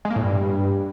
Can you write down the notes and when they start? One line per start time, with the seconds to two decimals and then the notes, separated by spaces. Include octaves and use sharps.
0.05 G#3
0.10 A#3
0.16 A2
0.21 G2